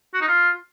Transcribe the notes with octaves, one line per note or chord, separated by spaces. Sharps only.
F#4
D#4
F4